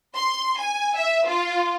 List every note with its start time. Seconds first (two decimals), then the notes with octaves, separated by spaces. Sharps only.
0.15 C6
0.60 G#5
0.97 E5
1.26 F4